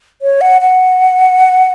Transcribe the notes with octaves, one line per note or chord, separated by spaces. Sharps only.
C#5
F#5
F#5